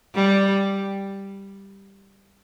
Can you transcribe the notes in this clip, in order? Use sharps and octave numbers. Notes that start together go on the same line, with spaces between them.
G3